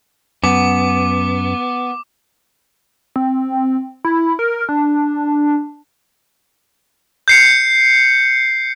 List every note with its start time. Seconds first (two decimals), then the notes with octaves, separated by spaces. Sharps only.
0.44 F#2 B3 D6
3.16 C4
4.05 E4
4.39 A#4
4.69 D4
7.28 G6 C7 C#7